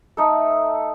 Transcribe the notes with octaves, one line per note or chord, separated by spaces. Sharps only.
A3 D#4 A4